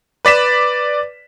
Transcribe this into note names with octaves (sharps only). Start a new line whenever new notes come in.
B4 D5 B6 E7